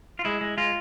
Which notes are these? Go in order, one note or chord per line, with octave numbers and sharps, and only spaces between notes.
F4
G#3 E4
G#3
G#3 F4